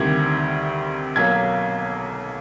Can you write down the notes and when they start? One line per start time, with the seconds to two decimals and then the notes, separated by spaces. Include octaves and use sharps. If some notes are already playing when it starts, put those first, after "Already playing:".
Already playing: D2 C3 D#3 G3 G#6
1.16 B1 B2 F#3 A#3 G#6